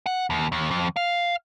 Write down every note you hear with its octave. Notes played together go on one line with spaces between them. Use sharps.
F#5
D#2
D#2
F2
F5